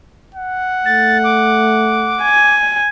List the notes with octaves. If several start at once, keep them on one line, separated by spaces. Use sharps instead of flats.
F#5
A3 A6
D6
G#5